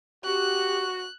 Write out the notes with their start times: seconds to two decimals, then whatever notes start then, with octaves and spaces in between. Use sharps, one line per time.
0.25 F#4 G4 F#6